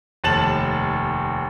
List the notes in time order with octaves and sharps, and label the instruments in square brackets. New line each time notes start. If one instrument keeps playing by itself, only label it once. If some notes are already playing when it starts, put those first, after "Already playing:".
[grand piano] F1 D#2 A5 A6 E7 F#7